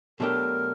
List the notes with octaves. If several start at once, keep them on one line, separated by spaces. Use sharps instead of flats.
B2 F#3 A3 D4 G4 A#4